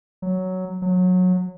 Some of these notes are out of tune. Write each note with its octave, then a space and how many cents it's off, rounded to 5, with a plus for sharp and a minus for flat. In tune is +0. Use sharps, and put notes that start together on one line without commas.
F#3 +5
F#3 -20